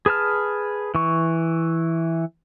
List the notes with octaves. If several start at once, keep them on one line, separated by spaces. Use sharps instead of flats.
G#4 B4 A5 F6
E3 C#6